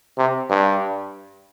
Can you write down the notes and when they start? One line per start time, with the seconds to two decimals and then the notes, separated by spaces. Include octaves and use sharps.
0.18 C3
0.50 G2